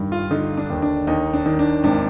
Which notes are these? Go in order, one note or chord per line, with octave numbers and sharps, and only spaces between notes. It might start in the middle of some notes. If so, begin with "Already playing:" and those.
Already playing: G2 D#3
F4
D3 D#4
D4
D#2
D4
D#2 D#4
D4
D#3
D4
G#1 D4